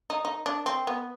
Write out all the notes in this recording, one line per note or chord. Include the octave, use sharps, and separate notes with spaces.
D#4
D#4
D4
C4
B3